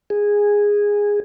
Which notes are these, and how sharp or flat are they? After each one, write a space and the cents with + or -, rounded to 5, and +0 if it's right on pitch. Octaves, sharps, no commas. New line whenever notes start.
G#4 -10